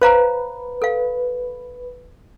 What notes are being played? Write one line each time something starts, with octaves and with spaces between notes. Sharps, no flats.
B4 C5 F5 A#5
A4 F5